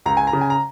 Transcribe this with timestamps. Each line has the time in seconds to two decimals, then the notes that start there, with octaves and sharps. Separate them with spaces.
0.06 C#2 A#5
0.17 G#5
0.27 A#5
0.33 C#3
0.41 G#5
0.50 A#5